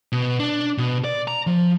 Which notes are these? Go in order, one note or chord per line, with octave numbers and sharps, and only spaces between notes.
B2
D4
B2
D5
A#5
F3